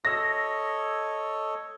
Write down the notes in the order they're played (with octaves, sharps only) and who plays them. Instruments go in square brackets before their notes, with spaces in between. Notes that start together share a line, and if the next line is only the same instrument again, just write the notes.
[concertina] A4 C#5 D#5 [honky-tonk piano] E6 A#6